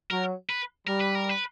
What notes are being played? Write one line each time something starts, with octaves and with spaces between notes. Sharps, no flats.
F#3 A#4
B4
G3 A#4
B4
A#4
B4